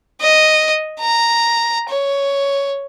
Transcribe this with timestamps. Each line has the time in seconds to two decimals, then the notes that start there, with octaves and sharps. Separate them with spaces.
0.21 D#5
1.00 A#5
1.89 C#5